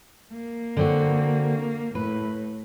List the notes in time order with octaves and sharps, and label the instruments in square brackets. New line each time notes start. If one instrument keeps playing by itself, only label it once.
[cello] A#3
[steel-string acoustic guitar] D3 C4 F#4
[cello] A2 [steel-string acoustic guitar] B4